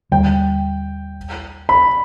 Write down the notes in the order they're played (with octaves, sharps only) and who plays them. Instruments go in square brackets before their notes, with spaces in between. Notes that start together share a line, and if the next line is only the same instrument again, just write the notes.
[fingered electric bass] D#2 D3 G3 [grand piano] G5
[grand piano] B5